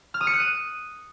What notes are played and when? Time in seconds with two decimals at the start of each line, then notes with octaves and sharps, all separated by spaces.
0.14 F6
0.21 D#6
0.27 C#7
0.33 F#6
0.40 D#7